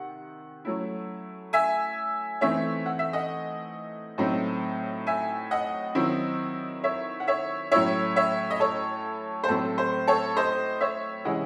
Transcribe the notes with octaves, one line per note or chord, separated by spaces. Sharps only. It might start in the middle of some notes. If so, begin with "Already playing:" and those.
Already playing: C3 D#3 F#5
F#3 A3 C#4 E4
E5 G#5
E3 A3 C4 D#4 C#5 E5
F#5
E5
D#5 F#5
A2 F#3 C4 D#4
E5 G#5
D#5 F#5
D#3 F#3 C4 E4
C#5 E5
F#5
C#5 E5
A2 F#3 C#4 E4 C#5 E5
C#5 E5
D#5
A4 C#5
C5
A2 F#3 C4 A4
C5
A4 C#5
C5 D#5
C#5 E5
C3 E3 G#3 C#4 E4 D#5 F#5